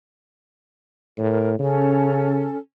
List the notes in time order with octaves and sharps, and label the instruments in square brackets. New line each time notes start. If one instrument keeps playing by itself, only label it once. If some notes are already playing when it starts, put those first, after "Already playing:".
[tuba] A2 [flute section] A#4
[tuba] C#3 [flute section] C#4 A4